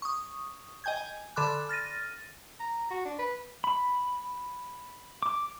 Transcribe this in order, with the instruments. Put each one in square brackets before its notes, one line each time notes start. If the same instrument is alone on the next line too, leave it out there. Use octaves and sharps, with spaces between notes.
[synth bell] C#6 D#6
D#5 G5 G#5 G6 G#6
G#5
D3 A4 B5 C6 D6 F#6
F6 A6 A#6 D#7
[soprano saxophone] A#5
F#4
D4
B4
[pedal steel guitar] B5
D6